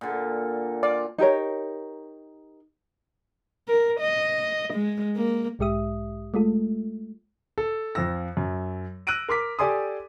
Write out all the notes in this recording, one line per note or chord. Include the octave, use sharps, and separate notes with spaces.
A#2 D3
F4 D5
D#4 G4 A#4 C#5
A#4
D#5
G#3
A#3
B1 G#2 G#3 G4 E5 D#6
G#3 A3 F4 A4
A4
F2 F3 F4 E6 A#6
F#2
E6 F#6 A#6 D7 D#7
A#4 C6 D6 B6
G4 A4 D5 G#5 C6 D#6